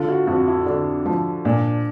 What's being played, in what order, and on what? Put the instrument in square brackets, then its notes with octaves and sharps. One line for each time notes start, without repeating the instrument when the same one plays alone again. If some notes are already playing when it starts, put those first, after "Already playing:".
Already playing: [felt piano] D3 [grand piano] F4
[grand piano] F#4
[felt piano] F2 [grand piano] F#4
[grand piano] E4
[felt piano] D3 [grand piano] D4
[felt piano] F3
[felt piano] A#2 [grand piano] D4